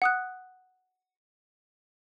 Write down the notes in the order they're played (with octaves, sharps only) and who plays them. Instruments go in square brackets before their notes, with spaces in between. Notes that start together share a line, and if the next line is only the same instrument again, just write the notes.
[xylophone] F#5 D#6 F#6